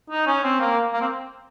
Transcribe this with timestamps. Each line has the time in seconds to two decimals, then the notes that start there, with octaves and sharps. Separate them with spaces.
0.10 D#4
0.27 C#4
0.43 C4
0.60 A#3
0.93 A#3
1.01 C4